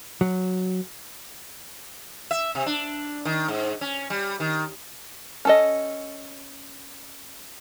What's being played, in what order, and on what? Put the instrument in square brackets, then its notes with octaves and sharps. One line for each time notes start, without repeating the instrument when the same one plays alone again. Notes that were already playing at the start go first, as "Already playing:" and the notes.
[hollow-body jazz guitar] F#3
[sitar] E5
C3
D4
D#3
G#2
C#4
G3
D#3
[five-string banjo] C#4 A4 D#5